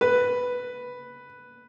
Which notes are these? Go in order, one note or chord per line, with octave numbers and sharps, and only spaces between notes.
B4